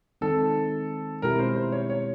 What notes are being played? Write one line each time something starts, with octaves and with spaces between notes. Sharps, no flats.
D#3 G#3 C4 D#4 A4
B2 G#3 C4 E4 G4 A#4
C5
C5
C#5
C#5